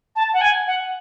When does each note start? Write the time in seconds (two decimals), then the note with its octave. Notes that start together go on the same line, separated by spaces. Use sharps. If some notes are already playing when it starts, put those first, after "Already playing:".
0.16 A5
0.33 F#5
0.41 G#5
0.66 F#5